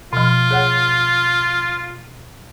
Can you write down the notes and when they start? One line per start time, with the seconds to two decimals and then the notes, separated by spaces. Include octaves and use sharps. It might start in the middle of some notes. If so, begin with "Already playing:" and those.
0.13 B2 F3 F4
0.51 G#4 C#5 F#5